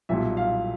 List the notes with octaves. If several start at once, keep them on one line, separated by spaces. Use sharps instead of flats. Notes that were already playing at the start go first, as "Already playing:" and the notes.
B1 A#2 G3 E5
F5